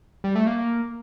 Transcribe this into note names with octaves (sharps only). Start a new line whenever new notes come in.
G3
A3
A#3